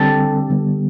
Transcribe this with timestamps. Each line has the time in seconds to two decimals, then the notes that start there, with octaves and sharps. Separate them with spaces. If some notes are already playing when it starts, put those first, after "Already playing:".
Already playing: D3 G3 C4 D4 G4 A4
0.49 D3 G3 B3